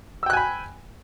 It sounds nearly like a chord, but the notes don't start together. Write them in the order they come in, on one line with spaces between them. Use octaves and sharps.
E6 G5 F#6 G#5 B5